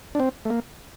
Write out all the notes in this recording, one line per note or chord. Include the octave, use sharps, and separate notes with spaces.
D4
C4
A3
A#3